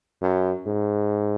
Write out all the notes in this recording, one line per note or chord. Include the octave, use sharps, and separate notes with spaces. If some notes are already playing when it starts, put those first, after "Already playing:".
F#2
G#2